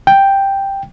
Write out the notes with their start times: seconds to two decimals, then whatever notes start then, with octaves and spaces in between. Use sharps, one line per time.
0.07 G5